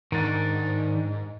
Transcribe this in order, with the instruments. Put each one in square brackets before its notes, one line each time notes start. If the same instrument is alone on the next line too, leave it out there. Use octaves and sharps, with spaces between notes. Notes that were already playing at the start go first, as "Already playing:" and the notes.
[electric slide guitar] G#2 [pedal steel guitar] D#3 D4